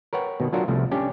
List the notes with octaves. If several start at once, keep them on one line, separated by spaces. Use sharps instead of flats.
A#4 B4 C#5 F#5 G5
B2 D#3
F#3 D4 F4 F#4 A#4
C2 F3 A3
C#4 D4 G4 D5